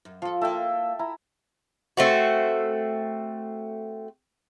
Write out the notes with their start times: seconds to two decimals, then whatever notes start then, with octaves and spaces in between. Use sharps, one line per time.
0.05 F#2
0.22 F3 F4 A4
0.41 A#3 E4 A4 E5 G5
0.99 E4 A#5
1.97 A3 C4 F#4